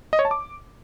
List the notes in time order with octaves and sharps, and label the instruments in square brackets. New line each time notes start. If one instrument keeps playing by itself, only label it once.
[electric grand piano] D#5
C#5
A5
D6